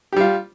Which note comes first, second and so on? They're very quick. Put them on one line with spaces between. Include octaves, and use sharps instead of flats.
G4 G3 F4